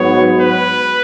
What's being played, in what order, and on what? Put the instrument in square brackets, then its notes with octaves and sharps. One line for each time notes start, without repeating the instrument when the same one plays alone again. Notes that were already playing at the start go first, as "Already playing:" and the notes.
Already playing: [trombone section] G#2 F#3 B3 [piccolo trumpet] C#5
[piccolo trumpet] B4